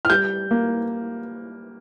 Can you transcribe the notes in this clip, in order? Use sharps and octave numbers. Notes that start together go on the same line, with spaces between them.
F6
G3 G6
A#3